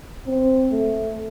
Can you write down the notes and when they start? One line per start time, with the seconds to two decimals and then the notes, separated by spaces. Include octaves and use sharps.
0.28 C4
0.72 A3